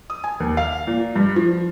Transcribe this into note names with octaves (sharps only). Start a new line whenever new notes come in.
D#6
G#5
D#2
F5
A#2
G2
F3